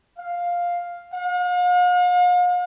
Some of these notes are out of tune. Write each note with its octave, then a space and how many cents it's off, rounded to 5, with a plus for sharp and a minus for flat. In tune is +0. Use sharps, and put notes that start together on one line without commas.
F5 +5
F5 +45